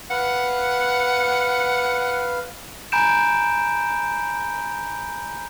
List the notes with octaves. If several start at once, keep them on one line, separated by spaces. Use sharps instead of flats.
B4 F5 F#5
G#5 A#5 B5 G6 D7 E7